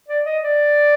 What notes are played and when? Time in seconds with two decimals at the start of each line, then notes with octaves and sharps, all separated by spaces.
0.08 D5
0.25 D#5
0.43 D5